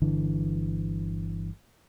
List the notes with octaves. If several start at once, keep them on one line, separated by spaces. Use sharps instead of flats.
G1 D3 E3